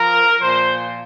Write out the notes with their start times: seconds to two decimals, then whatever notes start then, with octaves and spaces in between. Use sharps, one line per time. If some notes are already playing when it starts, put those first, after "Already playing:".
Already playing: F3 A#4
0.40 A#2 F3 C5